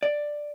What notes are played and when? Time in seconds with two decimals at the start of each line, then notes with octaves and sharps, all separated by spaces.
0.03 D5